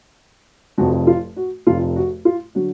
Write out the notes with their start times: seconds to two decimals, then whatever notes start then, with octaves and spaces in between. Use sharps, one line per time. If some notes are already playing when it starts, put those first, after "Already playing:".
0.78 F1 F2 F3 F#4
1.07 F4
1.37 F#4
1.67 F1 F2 F3 F4
1.96 F#4
2.25 F4
2.55 D3 F#3 F#4